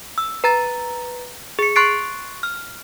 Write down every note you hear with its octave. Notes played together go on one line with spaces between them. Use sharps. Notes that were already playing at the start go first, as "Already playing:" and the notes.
E6
B4 A#5 A6
G#4 C#7
C6 C#6 F#6 A6 C7 D7
F6